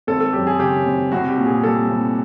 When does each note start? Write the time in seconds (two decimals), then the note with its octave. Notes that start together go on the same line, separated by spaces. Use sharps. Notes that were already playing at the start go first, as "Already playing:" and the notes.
0.07 G#1 A4
0.20 A4
0.33 F#2 G4
0.47 G#4
0.60 C#3 G4
0.86 G#1
1.12 C2 F#4
1.29 G4
1.38 A#2
1.46 G#4
1.64 G3 A4
1.90 C2